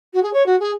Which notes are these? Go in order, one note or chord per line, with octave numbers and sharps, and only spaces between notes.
F#4
G#4
C#5
F#4
G#4